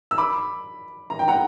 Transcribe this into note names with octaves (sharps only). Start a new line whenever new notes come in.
E6
B5 D6
A#5
G5
F#5 A#5